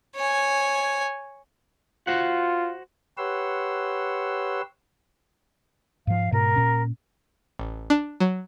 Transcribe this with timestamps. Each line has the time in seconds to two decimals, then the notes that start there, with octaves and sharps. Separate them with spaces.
0.16 C#5 G#5
2.07 F4 F#4 C5 F#5
3.18 G4 B4 C#5 F#5 C6 E6
6.07 G#2 F3 F5
6.32 G#2 B2 A#4
6.56 A#2 C#4
7.59 A1
7.90 D4
8.20 F#3